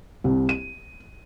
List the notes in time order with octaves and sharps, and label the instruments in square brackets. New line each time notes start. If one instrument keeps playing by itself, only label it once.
[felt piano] C2
D#7